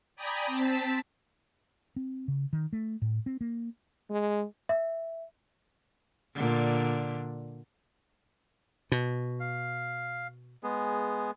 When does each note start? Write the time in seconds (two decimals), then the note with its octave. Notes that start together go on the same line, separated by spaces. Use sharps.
0.16 D5 G5 G#5 A#5 B5 D#6
0.46 C4 A5 B6
1.96 C4
2.28 C#3
2.53 D#3
2.73 A3
3.02 A2
3.26 C4
3.41 A#3
4.10 G#3
4.69 E5
6.35 A#2 D3
8.92 B2
9.40 F5
10.63 G#3 B3 G#4